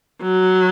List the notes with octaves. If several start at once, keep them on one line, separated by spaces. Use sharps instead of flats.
F#3